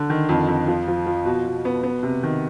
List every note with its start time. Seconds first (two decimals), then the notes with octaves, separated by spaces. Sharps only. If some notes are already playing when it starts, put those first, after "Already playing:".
Already playing: D3
0.10 D#3
0.29 F2
0.48 F2
0.68 F3
0.88 F3
1.06 F3
1.25 B2
1.46 B2
1.65 B3
1.83 B3
2.03 C3
2.23 D#3